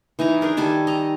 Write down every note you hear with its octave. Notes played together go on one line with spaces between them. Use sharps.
E3 D#4 G#5 A#5
D4 G#4 A#4 D5
D#3 G3 A4 G#5
D#5 A#5